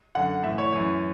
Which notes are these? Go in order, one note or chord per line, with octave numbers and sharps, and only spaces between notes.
F#2 D3 F#5
A2 E3 E5
C#5
F#2 E3 C#5